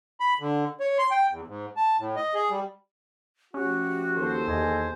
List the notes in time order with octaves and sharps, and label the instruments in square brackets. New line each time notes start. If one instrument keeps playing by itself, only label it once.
[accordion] B5
D3
C#5
C6
G5
E2
G#2
A5
A2
D#5
G#4
G3
[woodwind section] F3 A3 F#4 [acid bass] C#4 [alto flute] G4
[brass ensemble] D#2 A4 C5
[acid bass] E2 [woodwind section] D#5 F5 G#5